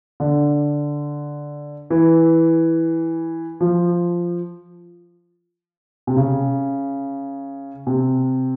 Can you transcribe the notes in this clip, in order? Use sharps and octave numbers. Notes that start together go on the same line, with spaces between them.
D3
E3
F3
C3
C#3
C3